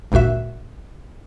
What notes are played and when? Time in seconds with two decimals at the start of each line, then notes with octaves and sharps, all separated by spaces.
0.12 G#1 D2 A#2 F#4 E5